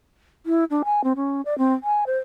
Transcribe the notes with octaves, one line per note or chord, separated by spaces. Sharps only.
E4
D4
G#5
C4
C#4
D5
C4
G#5
C5